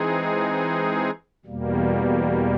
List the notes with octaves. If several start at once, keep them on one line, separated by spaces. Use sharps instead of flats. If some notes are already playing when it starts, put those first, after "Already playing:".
Already playing: E3 G#3 C4 D#4 G#4
E2 B2 G3 A#3